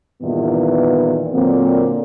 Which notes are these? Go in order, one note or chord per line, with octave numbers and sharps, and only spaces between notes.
E2 G2 A#2 D#3 E3 B3
A#2 D3 F#3 A#3 C4